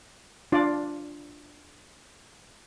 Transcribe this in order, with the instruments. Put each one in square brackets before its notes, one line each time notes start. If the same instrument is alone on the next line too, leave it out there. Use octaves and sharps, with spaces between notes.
[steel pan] D4 F4 D5